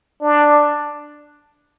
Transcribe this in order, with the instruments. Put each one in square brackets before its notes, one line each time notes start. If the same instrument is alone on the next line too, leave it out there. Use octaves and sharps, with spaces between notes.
[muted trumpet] D4